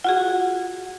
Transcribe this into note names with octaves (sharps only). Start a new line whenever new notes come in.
F4 F#4 G#4 F#5